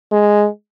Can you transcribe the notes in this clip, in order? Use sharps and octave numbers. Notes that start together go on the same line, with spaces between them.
G#3